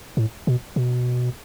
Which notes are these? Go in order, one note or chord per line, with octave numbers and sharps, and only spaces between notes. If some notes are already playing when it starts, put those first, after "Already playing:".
A2
B2
B2